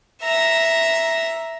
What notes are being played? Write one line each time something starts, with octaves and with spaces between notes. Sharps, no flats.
E5 A#5